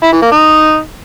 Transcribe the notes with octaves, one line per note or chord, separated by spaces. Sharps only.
E4
E3
A#3
D#4